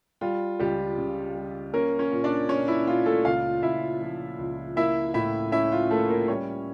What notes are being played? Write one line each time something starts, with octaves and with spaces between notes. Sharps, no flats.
G3 F4
C#2 G3 G4
C#3
G3
A#3 C#4 A#4
C#4 C#5
A#2
D4 D5
C#4 C#5
E4
A#2 F4
A3 A4
C#2 F4 F5
C#2 E4 E5
F3
C#2
A#3 E4 E5
A2 E4 E5
C#4 E4 E5
F4
A3 A#3 A4
A#3 A#4
G3 C#4 C#5